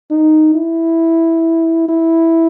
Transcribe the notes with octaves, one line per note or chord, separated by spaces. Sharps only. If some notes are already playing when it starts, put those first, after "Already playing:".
D#4
E4
E4